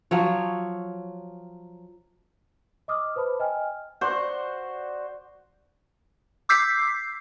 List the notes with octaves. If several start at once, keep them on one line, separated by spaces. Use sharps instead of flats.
F3 F#3 C#5
D#5 D6 D#6 F6
B4 C5 A5 B5
D#5 G5 G#5 F6
F#4 C5 D5 C#6
D6 E6 G6 B6 C7